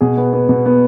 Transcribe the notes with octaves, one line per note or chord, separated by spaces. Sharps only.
B2 G#4
B3
B3
B2
B3